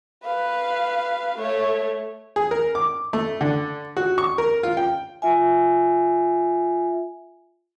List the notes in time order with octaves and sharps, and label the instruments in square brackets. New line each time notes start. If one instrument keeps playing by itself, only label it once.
[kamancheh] B4 F5
A3 C#5
[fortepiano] G#4
A#4
D6
A3
D3
F#4
C#6
A#4
F4
G5
[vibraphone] F4 E5 G#5